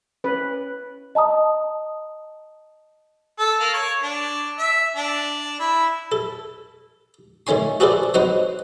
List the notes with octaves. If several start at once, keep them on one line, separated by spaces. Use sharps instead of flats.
C#4 B4
D#5 A5 A#5 D#6
A4
A#3
C#5
D4
E5
D4
E4
A4
D#3 A3 C#4 G#5 C6
F#4 G#4 A4 B4 C5 D5
F#3 C4 D#4 B4 C5 F#5